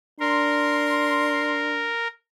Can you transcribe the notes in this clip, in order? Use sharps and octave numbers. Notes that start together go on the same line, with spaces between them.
D4 A#4 C6